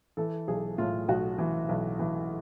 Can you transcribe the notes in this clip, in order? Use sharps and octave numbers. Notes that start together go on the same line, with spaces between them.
E3 A4
B1 G#4
A2 F4
B1 F#4
E3
B1
E3